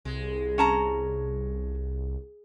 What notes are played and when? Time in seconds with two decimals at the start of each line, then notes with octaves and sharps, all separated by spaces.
0.05 C2 G#3
0.58 C#4 A5 A#5